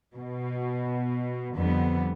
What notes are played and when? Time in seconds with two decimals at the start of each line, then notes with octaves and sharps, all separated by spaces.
0.15 B2
1.56 F2 D3 G3 B3